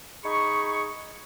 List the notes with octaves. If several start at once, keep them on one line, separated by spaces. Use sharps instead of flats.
D#4 G#4 B5 C#6